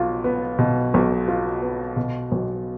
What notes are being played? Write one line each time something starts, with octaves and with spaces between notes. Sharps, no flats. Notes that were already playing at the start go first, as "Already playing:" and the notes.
Already playing: B1 B2 F4
B3
B2
B1
F4
B3
B2
B1